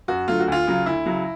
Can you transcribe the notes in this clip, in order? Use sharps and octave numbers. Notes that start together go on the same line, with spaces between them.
F#2 F#4
D3 F#3 A3 F4
F#4
D2 F4
C#3 F#3
D2 E4
C#3 F#3